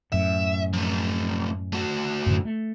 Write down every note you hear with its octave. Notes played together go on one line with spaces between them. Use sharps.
F#2 A2 E5
F3 A3
A3 F#4
F#2 A2 D3
A3